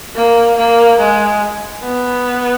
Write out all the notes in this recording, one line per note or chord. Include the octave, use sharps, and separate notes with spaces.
A#3
A#3
G#3
B3